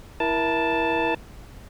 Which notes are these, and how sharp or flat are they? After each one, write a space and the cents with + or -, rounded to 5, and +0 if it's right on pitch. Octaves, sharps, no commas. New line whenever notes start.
E4 +0 A#4 +30 A5 +0